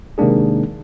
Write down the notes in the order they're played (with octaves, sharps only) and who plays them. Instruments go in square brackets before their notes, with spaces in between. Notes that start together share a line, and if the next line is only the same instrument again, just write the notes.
[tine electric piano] C3 D#3 G#3 A#3 D4 G#4